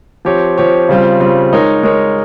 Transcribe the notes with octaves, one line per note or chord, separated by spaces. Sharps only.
F3 C4 G4 C#5
F3 C4 G4 C#5
C#3 G3 C4 F4
C#3 G3 C4 F4
G#3 D#4 A#4 C#5
G#3 D#4 A#4 C#5